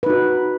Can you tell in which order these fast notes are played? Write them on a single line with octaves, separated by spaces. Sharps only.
B4 D#4 F#4